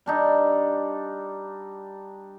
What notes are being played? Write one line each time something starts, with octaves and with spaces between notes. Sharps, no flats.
G3 D4 D#4